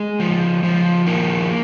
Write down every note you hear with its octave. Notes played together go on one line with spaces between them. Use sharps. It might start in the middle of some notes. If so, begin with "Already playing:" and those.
Already playing: G#3
F3
F3
D#3 A#3